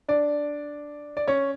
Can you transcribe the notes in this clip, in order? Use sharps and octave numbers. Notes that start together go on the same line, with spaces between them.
D4 D5
D5
C#4 C#5